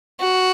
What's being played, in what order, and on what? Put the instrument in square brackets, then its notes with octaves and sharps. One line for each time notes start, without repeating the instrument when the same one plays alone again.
[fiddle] F#4